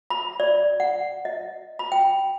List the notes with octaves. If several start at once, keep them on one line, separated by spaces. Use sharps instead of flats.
B5
D5
F#5
D#5
B5
G5